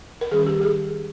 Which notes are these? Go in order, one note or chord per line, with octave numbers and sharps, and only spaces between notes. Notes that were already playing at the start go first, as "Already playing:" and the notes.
A#4
D#3 G3 C#4 G#4
G4
G#4